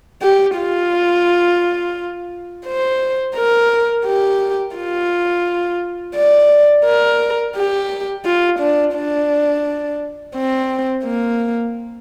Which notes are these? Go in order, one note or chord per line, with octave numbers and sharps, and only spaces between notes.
G4
F4
C5
A#4
G4
F4
D5
A#4
G4
F4
D4
D4
C4
A#3